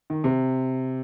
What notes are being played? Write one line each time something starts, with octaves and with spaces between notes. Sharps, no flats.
D#3
C3